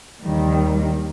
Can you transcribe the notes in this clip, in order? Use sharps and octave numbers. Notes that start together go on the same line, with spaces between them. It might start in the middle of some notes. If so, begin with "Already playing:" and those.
D#2 D#3 G3